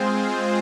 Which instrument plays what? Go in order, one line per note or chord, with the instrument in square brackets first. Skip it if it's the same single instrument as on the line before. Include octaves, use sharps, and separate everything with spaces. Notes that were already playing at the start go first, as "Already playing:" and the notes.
Already playing: [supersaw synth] G#3 C4 F4 G#4 C5